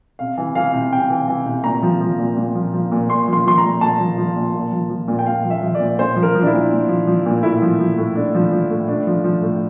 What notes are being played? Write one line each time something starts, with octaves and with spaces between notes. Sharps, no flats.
C3 F5
E3
E3 F5
C3
C3 G5
E3
E3
C3
A#2 A#5
F3
F3
A#2
A#2
F3
F3
A#2
A#2 C6
F3
C6
F3 C6
A#5
A#2
A#2 A5
F3
F3
A#2
A#2
F3
F3
A#2
G5
A#2 F5
F3
E5
F3
D5
A#2
A#2 C5
F3
A#4
F3
D4
E4
A#2
A#2
F3
F3
A#2
A2 E4
F3
F3
A2
A2 D4
F3
F3
A2
A2 D4
F3
F3
A2